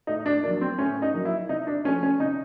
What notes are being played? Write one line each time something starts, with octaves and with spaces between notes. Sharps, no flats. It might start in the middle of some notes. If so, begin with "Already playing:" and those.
A2 D#4
D4
F#3 A#3 D4
C4
A2 C#4
D#4
F#3 A#3
E4
C3 D#4
D4
F3 A3 C#4
C#4
C3 D#4